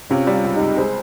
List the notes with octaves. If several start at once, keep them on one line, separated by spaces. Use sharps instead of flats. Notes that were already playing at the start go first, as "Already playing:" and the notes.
C3 C#4 F4
G3
C#4 F4
C#2
D#4 G4
C#2
G#3 G#4 C5